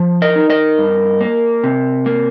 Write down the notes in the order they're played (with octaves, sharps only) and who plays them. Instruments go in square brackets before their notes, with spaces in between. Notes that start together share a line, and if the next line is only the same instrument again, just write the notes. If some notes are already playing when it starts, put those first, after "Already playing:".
Already playing: [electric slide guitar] F3
A#4 D#5
D#4
A#4 D#5
G2
A#3
C3
A#3